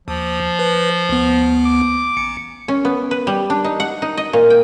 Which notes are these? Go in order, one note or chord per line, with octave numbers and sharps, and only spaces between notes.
D#2 F3
B4
D2 B3
D6
A1 C#7
C#4
B3
B4
G3
D4
D#4
F#5
D#4
D#5
A#2
G5